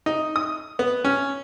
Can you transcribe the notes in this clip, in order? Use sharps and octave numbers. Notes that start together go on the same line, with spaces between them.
D#4
D#6
B3
C#4